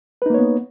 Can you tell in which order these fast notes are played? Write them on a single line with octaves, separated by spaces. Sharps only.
B4 D#4 A#3 C#5 B3